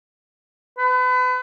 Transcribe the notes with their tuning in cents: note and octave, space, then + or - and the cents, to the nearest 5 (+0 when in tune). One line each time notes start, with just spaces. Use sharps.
B4 +35